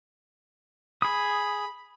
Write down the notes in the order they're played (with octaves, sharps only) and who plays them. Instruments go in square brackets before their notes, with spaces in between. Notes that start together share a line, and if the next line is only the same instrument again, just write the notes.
[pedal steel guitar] G#4 D#6 [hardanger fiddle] B5